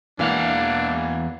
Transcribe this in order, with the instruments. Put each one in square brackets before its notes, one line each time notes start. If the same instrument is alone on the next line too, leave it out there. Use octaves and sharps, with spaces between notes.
[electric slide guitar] E2 F5 F#5 [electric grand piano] E3 A#3 [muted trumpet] D4